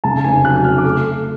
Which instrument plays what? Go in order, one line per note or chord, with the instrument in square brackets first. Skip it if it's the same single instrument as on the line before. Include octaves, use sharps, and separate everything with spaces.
[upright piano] C#3 A5
F1 G#5
F#3 F#6
F1 F6
D6
A3 F6
A3